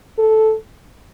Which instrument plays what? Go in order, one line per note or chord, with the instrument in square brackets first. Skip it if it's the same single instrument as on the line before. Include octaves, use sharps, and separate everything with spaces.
[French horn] A4